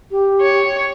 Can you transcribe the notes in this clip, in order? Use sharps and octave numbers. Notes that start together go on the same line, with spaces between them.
G4
C#5